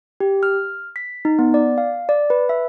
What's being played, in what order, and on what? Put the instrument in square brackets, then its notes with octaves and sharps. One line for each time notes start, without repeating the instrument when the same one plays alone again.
[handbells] G4
F6
B6
D#4
B3
D5
F5
D5
B4
E5